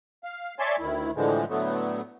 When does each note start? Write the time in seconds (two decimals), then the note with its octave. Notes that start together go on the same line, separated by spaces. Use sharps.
0.24 F5
0.59 C#5 D5 E5 G#5 A5 C6
0.79 D2 D#3 E4
1.16 A2 D3 E3 F3 G#3
1.49 A2 D3 F#3 A3 B3